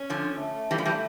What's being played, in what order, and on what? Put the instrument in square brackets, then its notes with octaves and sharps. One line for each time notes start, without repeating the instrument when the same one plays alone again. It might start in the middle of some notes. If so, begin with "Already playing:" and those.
Already playing: [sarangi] C#4
[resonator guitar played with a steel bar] D3 F3
[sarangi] A3
[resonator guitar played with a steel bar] E3 G3
F3
E3 G3